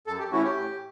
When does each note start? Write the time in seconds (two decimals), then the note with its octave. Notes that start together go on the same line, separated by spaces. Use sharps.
0.07 F#2 A4
0.19 G4
0.32 E3 A3 C#4 E4 F#4
0.44 G4
0.56 A2